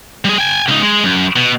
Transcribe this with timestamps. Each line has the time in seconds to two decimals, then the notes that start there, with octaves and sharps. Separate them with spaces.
0.25 G3 G#4
0.38 G5 G#5
0.69 C#2 D#4
0.82 G#3
1.04 F#2
1.36 B2